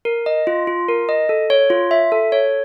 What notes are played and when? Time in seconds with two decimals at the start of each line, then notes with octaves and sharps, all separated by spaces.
0.05 A#4
0.26 D#5
0.47 F4
0.67 F4
0.89 A#4
1.09 D#5
1.29 A4
1.50 C#5
1.70 F4
1.91 E5
2.12 A4
2.32 C#5